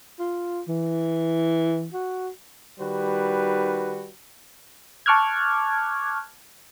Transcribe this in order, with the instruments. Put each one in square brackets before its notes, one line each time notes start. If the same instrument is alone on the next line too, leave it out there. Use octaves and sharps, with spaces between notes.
[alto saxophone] F4
E3
F#4
[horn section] D#3 G3 F#4 B4
[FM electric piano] A5 C#6 D6 F6 F#6 G#6